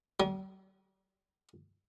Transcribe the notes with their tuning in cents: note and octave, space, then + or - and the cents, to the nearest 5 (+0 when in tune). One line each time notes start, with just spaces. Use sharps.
G3 -45